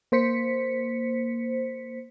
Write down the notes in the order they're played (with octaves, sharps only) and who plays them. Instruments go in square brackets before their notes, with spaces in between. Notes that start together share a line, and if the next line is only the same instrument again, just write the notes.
[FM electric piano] A#3 C5 B6 C#7